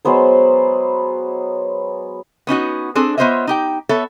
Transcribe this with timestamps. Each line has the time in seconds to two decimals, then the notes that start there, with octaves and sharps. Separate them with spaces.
0.05 F#3 G#3 B3 C5
2.47 B3 C#4 D#4 F#4
2.95 C4 D4 G#4 A4
3.17 B3 F4 C5 C#5 D#5 E5
3.47 D#4 G4 G5
3.89 B3 A4 C#5 E5